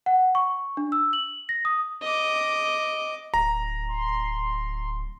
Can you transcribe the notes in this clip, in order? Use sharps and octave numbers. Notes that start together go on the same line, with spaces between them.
F#5
C#6
D4
E6
F#7
A#6
D#6
D#5 D6
D1 A#5
C6